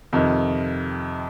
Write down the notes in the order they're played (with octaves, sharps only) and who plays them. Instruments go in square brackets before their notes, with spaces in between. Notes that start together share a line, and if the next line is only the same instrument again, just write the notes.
[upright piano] F2 C3 D#3